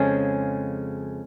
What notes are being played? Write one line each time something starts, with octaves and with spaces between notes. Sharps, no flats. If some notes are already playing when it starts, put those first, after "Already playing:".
Already playing: F2 C#3 F3 G#3 C#4